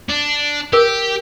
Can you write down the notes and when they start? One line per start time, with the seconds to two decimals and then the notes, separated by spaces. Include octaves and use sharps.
0.09 D4
0.73 G4 A#4